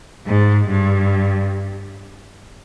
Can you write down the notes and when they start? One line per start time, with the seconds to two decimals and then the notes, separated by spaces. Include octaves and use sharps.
0.27 G#2
0.68 G2